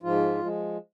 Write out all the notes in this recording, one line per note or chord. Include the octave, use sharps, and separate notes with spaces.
G#2 F3 F4
F3 G#3